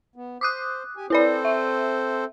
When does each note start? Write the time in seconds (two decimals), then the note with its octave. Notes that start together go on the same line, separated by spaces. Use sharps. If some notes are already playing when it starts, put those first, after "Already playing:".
0.16 B3
0.41 C5 D6 D#6 F#6
0.97 G4 G#5
1.10 C4 E4 A4 B4 C5 D5
1.45 E5